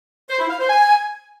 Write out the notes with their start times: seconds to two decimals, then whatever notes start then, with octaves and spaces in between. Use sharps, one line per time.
0.30 C5
0.40 E4
0.50 F5
0.60 C5
0.70 G#5